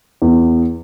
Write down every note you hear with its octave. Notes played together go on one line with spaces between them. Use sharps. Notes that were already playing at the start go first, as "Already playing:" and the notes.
E2